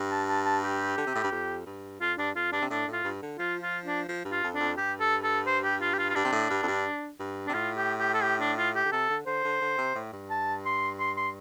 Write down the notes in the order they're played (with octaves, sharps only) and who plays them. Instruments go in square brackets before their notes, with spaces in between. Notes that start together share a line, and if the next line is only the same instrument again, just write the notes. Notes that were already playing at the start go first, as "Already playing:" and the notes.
Already playing: [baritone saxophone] G2
[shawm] A5
A5
A5
G4
[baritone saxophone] D3
C3
A2
G2
F2
G2
[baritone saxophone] F2 [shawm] F4
[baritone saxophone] G2 [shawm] D4
[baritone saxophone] F2 [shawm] F4
[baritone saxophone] G2 [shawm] D4
[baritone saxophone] C3
[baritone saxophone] A2 [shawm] D4
[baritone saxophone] A2
[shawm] F4
[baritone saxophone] G2
D3
[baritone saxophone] F3 [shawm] F4
[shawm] F4
D4
[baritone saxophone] F3
G2
[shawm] F4
[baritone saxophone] F2
[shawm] D4
[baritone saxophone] F2
[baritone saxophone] G2 [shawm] G4
[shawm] A4
A4
C5
G4
F4
G4
F4
F4
[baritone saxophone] G2 [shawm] D4
[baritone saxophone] C3
A2
G2
F2
G2
G2
[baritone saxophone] C3 [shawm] D4
[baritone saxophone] A2 [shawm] F4
[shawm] G4
G4
A4
G4
D4
F4
G4
[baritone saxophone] D3
[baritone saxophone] C3 [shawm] A4
[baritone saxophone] D3
[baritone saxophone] D3 [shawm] C5
[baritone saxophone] D3
D3
C3
A2
G2
[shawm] A5
C6
C6
C6